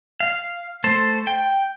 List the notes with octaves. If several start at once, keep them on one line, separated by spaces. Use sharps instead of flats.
F5
A3 A4 C5
G5